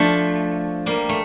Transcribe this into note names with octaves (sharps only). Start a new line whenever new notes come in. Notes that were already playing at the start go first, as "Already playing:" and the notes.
Already playing: F3 A3 D4
G3 A#3
A3